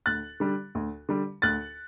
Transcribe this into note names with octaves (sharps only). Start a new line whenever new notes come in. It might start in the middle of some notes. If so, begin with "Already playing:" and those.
D2 F#6 A6
D3 G3
D2
D3 G3
D2 F#6 A6